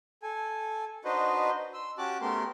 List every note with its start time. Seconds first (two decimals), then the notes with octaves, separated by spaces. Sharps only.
0.23 A4 G#5
1.05 D4 D#4 F#4 B4 C5 D#5
1.74 C6 E6
1.98 C#4 F#4 G4 A5 D6 F#6
2.21 A3 B3 C#4 G4 A#4 C6